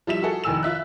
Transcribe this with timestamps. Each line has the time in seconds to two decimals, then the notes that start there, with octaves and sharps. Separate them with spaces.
0.07 F3 G3 E5 E7
0.23 F#4 G#4 A4
0.44 F1 D#3 G#5 E6 E7
0.63 F4 E5 F#6